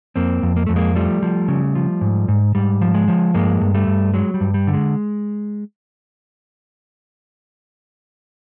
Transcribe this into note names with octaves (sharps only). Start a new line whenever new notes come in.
F2 A#3 C4
F2
A#3
F2 A3
G#3 A#3
F3 G3 A3
F3
C#3
F3
G#2
G#2
G#2 G3
F3
G#3
F3
G2 G#3 A#3
G2
G3 A3
G2
F#3 G#3
G3
G2
G3
D3
G#3